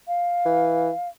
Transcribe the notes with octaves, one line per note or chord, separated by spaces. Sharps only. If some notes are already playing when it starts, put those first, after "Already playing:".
F5
E3